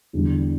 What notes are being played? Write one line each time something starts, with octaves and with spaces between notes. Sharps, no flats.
E2 D3 G3